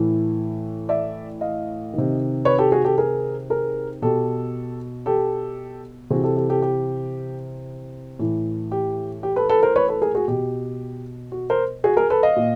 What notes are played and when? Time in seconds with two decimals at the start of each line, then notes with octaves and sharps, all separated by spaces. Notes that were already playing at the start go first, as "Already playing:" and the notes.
Already playing: A2 E3
0.89 D5 E5
1.41 D#5 F5
1.94 C3 D#3
2.45 B4 C#5
2.58 G4 A4
2.72 F#4 G#4
2.84 G4 A4
2.98 G#4 A#4
3.50 G#4 A#4
4.02 B2 G4 A4
5.06 G4 A4
6.10 C3 E3 F#4 G#4
6.23 G4 A4
6.37 G4 A4
6.50 G4 A4
6.62 G4
8.19 A2 E3
8.72 G4
9.23 G4
9.36 A4 B4
9.49 A4 B4
9.63 A#4 C5
9.76 B4 C#5
9.88 A4 B4
10.02 G#4 A#4
10.15 F#4 G#4
10.28 B2 G4
11.32 F#4
11.50 A#4 C5
11.84 F#4 G#4
11.97 G#4 A#4
12.10 A4 B4
12.23 D#5 F5
12.36 A#2